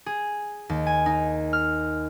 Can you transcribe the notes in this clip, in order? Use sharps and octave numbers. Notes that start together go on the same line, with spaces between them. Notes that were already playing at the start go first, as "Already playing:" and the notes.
G#4
D#2
G#5
D#4
F6